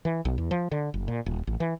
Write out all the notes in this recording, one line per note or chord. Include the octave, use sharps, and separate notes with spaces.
E3
B1
E2
F3
D3
F#1
A#2
D#1
A1
E3